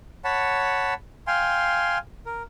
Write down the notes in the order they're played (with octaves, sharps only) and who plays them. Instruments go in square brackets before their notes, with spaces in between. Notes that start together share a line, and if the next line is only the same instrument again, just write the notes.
[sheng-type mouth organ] C#5 F#5 A5 B5
F5 G5 G#5 C6
A#4